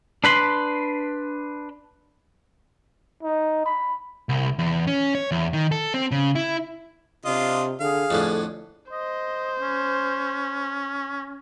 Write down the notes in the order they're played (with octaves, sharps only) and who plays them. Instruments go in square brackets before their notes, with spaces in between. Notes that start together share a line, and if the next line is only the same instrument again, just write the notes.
[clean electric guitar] D4 B4 B5 C6
[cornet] D#4
B5
[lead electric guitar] C2
E2
C#4
C#5
E2
D#3
A4
C4
C#3
E4
[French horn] C3 [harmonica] D4 F4 D#5
[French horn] D3 [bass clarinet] G#4 [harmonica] F5
[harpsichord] F2 A2 D3 [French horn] A4
[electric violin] C5 [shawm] D#5
[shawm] C#4